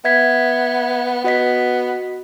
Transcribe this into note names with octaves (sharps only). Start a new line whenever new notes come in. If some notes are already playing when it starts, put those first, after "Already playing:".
B3 E5 G#6 B6
B3 F#4 D#5 B6